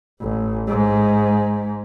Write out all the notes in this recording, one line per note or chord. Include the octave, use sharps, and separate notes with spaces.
A1
G#2